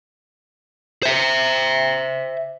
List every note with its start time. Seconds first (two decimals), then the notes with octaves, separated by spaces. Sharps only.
1.03 C5 E5